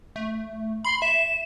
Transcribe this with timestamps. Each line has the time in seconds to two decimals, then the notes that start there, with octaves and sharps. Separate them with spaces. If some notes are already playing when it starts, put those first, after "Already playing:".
0.16 A3
0.85 B5 C6
1.02 E5 E7